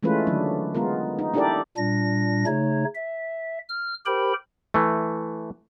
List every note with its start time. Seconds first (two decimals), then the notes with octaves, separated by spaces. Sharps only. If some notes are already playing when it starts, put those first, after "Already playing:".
0.03 E3 G#3 A3 C#4 F4 B4
0.27 D3 D#3 F#3 D4
0.75 G#3 B3 F4 A#4
1.19 D#4
1.34 D4 E4 G4 A4 A#4 D5
1.77 A#2 G3 D4 A#6
2.47 C#3 A3 D#4 C#5
2.95 E5
3.69 F6
4.06 G4 A#4 C5 G5 B5
4.74 E3 A3